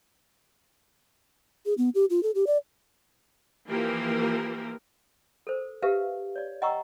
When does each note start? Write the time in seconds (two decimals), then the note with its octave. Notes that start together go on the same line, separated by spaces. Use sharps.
1.66 G#4
1.78 B3
1.95 G4
2.10 F4
2.23 A4
2.35 G4
2.47 D5
3.69 E3 F3 A#3 G4 A#4
5.47 A4 A#4 C5
5.82 G4 A#4 B4 E5 F5
6.36 C#5 D5
6.62 D#5 F#5 G5 A#5 C#6 E6